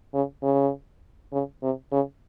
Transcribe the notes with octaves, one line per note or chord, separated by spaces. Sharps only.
C#3
C#3
C#3
C3
C#3